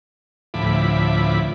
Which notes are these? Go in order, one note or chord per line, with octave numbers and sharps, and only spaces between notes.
D2 A2 F3 E4 B5 D6